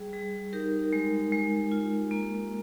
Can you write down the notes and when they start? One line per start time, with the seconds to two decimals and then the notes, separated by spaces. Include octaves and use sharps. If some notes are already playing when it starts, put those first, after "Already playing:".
Already playing: G3 G#4
0.13 G3 G#4
0.53 D#4 G4 A#4
0.93 G#3
1.32 G#3
1.72 F4
2.11 A#3